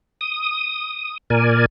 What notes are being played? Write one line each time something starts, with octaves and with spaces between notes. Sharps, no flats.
D#6
A#2 A#4 D5 G#5